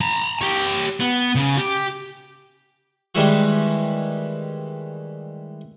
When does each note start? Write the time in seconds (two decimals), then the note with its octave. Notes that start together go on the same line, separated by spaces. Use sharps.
0.01 A5 A#5
0.41 G4 C#5
1.00 B3
1.35 C#3
1.57 G4
3.15 D#3 E3 G3 G#3 E4 F#4